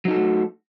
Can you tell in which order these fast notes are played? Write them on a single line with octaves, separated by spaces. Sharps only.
F#3 D#4 A4 F#4 A3